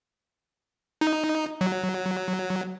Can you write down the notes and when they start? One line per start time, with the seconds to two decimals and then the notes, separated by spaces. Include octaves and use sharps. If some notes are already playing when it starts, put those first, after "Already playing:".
1.01 D#4
1.61 F#3